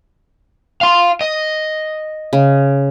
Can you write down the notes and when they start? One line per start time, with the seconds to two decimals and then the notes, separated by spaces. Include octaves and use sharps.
0.81 F5 C6
1.21 D#5
2.33 C#3